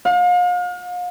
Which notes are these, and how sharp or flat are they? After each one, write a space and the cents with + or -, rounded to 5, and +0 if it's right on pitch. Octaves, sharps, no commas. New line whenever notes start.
F5 +40